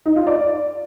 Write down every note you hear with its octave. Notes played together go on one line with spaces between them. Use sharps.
D#4
F4
D5